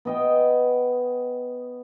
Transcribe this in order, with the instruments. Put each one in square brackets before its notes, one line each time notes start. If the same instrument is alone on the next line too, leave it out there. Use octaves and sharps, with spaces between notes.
[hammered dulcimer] B3 D#5 G5